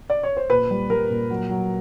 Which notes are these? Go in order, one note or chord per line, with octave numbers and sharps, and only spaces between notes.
D5
C#5
C5
A#2 B4
G3
G3 A#4
A#2
F#3
F#3